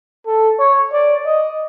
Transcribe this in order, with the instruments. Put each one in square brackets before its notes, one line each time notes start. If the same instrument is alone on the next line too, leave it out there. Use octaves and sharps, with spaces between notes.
[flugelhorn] A4
C#5
D5
D#5